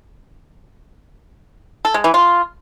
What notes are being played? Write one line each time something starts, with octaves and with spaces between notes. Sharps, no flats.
A4
G#3
E3
F4